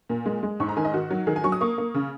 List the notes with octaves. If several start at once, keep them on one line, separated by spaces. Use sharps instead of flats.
A#2
G#3
G#3
G#2 C#6
A#5
D#3 G#5
D#5
D#3 F#4
F#3
D#3 G#4
G#5
F#3 C#6
D#6
A#3 C#6
A#3
C#3